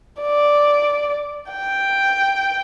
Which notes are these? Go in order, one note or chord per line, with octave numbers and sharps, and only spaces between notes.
D5
G5